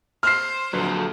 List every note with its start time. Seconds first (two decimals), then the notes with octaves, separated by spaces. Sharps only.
0.23 C5 F6 C7
0.73 A#1 D3 F#3 A4 B4